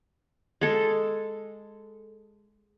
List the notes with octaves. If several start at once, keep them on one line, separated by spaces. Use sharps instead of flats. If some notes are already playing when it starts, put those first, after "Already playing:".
G#3 A4